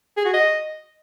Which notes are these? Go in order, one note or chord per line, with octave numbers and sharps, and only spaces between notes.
G#4
F#4
D#5